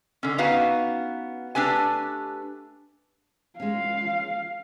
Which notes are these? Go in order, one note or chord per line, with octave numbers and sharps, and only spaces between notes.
D3 C#4
B3 C#4 D#4 F#4 B4 F5
A3 D4 G4 B4 G#5
G#3 C#4 F5